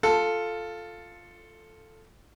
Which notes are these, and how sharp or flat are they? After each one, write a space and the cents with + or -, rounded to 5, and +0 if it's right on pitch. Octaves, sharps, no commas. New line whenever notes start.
F4 +0 A4 +0